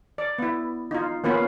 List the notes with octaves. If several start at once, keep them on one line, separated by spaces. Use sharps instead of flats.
D5
B3 E4
D#4 F4
A#3 B3 C#4 F4 B4